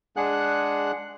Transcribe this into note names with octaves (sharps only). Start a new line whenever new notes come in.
G#3 D4 G#4 F#5 F#6